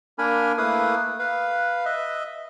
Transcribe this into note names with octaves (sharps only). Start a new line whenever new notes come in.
A#3 D4 A#4 G#5 B5 F6
A3 A#3 E4 B4 F5 D#6
B4 F5
D#5 E5